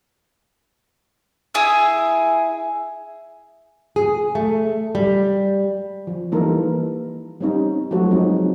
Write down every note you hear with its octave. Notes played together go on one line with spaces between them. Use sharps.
E4 G#4 E5
G#4
A3
G3
F3
E3 G3 A#3 D#4 A4 A#4
G3 C4 C#4 D#4
F3 F#3 G#3 A3 F#4 A4
F#3 G#3 C4 D#4